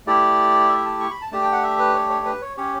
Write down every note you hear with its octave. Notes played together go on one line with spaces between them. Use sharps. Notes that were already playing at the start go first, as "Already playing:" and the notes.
A3 E4 G4 D5
E5
A5
C#6
B5
A5
A3 D4 G4 A5
G5
F#5
E5
B4
C#5
C#5
B4
C#5
C#4 G4 C#5